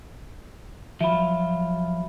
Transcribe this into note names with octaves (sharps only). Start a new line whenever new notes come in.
F3 F#3 F4 E5 B5